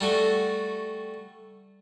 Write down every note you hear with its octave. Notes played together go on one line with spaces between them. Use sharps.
G3 A3 F#4